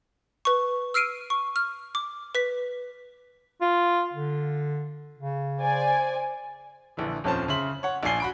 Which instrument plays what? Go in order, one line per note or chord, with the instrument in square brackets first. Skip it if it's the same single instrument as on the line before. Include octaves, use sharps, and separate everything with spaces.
[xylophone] B4 C#6
E6 F6 C7 D7 D#7
C#6
F6
D6
B4 B6
[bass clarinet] F4
D3
C#3
[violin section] C5 D5 G#5
[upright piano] A#1 D3 E3
D#1 F2 F3 C#4 C5 A5
C#3 E5 C6 F#7
C#5 F#5
A#1 D4 F4 G#5 C7 G7
F#4 B5 D7